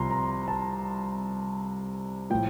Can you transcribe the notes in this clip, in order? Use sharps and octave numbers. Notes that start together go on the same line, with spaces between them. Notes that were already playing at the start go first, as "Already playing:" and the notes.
Already playing: C2 C3 F3 A#5 C6
A#5
A5
A2 F3 G5